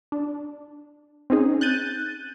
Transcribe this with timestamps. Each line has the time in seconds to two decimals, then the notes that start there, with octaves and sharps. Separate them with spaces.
0.12 D4
1.30 C4 C#4 D#4 G#4
1.61 F#6 G6 A6 D#7